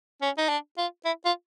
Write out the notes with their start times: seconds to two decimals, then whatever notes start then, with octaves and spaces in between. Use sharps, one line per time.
0.22 C#4
0.38 D#4
0.49 D4
0.78 F4
1.05 E4
1.26 F4